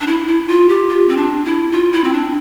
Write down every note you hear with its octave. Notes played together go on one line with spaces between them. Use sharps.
D4
E4
E4
F4
G4
F4
C4
D4
E4
F4
E4
C4
D4